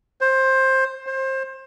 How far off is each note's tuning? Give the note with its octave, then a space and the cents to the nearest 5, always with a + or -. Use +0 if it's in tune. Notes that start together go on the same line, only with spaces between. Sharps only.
C5 +15
C5 +25